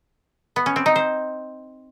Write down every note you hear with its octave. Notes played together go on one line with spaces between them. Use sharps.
B3
C#4
C4
D#4
C5